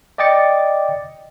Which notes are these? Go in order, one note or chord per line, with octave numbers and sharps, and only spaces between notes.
D5 D#5 G5 D6 A6 C#7